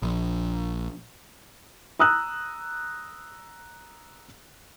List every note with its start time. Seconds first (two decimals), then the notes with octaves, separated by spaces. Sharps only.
0.02 A#1
1.99 A#5 D#6 E6 F#6